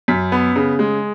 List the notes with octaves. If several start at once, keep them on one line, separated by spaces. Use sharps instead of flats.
F#2 B6
B3
C#3
G#3